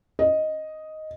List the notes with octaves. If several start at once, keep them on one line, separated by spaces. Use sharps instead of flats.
D#5